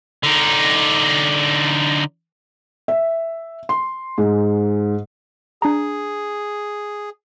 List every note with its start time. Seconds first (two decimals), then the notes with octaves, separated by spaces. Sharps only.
0.23 D3 D#4
2.88 E5
3.69 C6
4.18 G#2
5.62 D4 G#4 A#5